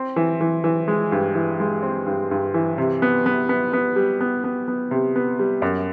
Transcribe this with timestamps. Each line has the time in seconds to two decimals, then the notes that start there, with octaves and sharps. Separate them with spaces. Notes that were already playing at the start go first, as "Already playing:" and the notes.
Already playing: C4
0.16 E3
0.41 E3
0.64 E3
0.88 G#3
1.12 G2
1.35 E3
1.60 G#3
1.83 C4
2.06 G2
2.31 G2
2.54 E3
2.78 C3
3.02 B3
3.26 B3
3.49 B3
3.73 B3
3.96 G3
4.21 B3
4.44 B3
4.68 B3
4.91 C3
5.16 B3
5.39 G3
5.62 F#2